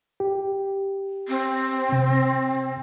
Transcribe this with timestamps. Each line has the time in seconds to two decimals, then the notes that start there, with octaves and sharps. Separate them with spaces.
0.20 G4
1.28 C4
1.92 C3